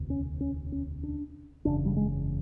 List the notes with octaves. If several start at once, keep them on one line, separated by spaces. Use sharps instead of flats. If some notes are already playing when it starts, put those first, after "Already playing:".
Already playing: E1 D2 C3
C#4
C#4
C#4
D4
F#1 E2 C#3 D4
G3
G#3